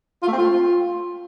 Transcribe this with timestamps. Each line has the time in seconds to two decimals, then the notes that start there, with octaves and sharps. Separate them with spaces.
0.22 F4
0.28 A3
0.33 C4
0.38 F4